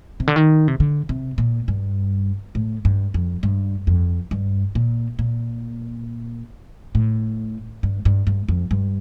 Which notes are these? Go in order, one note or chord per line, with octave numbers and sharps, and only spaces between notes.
C3
D3
D#3
C3
D3
C3
A#2
G2
A2
G2
F2
G2
F2
G2
A#2
A#2
A2
G2
G2
G2
F2
G2